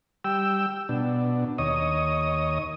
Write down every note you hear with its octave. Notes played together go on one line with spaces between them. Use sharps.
G3 G5 E6
B2 D4
D#2 C#5 D#5 D#6